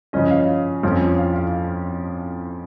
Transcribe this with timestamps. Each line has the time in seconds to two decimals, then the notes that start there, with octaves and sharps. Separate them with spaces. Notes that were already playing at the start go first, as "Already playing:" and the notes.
0.13 C#3 F3 C#4 D#5
0.30 F5
0.83 F2 F3 C#4
1.18 F5
1.36 F5